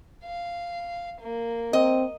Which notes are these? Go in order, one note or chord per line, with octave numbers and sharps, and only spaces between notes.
F5
A#3
C4 D#5